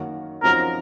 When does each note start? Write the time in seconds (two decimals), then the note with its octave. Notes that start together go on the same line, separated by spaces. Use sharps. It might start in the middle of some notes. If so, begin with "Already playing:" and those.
Already playing: F#2 D#3 A#3 C#4 F#4
0.43 F#2 F3 C4 D#4 F#4 A#4